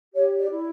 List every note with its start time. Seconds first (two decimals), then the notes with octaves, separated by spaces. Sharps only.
0.15 G4 C#5
0.39 D5
0.50 E4